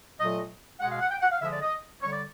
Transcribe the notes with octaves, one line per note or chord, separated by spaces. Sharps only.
A#2 F#3 A3 D#5
B2 G#3 F#5
F5
F#5
G5
F#5
F5
D3 F3 G#3 E5
D5
D#5
D3 G3 C#5
D5